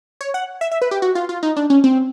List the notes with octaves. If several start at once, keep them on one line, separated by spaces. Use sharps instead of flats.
C#5
F#5
E5
E5
B4
G4
F#4
F4
F4
D#4
D4
C#4
C4